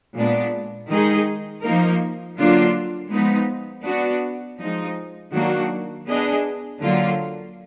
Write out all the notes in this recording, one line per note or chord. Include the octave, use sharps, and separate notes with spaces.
A#2 G#3 B3 D4
D#3 G#3 D#4 G#4 D#5
F3 A#3 D#4 A#4
D3 F#3 A#3 D4 F4
F3 G#3 B3 D#4
B3 D4 F#4
F3 G#3 D#4
D#3 F#3 A#3 D4 F#4
B3 D4 G#4 D#5
D3 F#3 A#3 F4